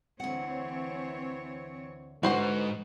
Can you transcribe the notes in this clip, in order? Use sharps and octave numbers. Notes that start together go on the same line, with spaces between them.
D2 E3 C4 C#5 F#5
F2 G#2 D3 F#4 B4 C5 F#5